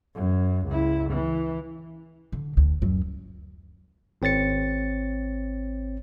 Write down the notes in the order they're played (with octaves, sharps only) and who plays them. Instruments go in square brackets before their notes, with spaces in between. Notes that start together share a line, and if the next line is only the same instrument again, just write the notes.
[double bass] F#2
C#2 E4
E3
[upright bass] D3
D2
F#2 F#3
[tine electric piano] G#1 C4 C#5 A6 C#7